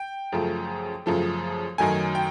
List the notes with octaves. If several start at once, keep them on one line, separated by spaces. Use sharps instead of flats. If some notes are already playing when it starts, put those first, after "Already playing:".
Already playing: G5
F#2 C#3 F3 A3
F#2 C#3 F3 A3
F#2 D#3 F#3 A3 G#5
G5